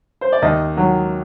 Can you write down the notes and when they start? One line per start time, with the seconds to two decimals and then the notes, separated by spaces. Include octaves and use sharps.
0.21 C5
0.32 D5
0.42 D#2 D#4 D#5
0.77 D#3 F#3